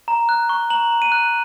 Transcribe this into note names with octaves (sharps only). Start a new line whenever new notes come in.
A#5
F#6
C#6
A#5 F#7
A#5
D#7
F#6